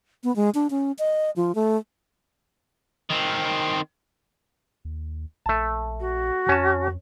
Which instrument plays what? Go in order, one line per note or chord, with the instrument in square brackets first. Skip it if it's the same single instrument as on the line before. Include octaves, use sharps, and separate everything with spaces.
[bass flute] B3
G#3
D4
C#4
D#5
F3
A3
[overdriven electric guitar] D#3 C4
[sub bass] D#2
[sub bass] A#1 [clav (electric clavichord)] A3 A5
[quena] F#4
[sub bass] F2 [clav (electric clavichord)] C#4 A5